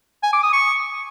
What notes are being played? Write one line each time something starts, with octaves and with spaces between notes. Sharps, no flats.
G#5
D6
D#6
C#6